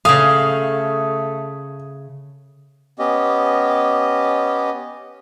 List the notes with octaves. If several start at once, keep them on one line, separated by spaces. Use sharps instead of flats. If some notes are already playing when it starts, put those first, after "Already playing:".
C#3 A3 F5 D#6
B3 C#4 G4 D#5